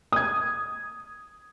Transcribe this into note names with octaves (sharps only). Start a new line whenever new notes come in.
D#6 G#6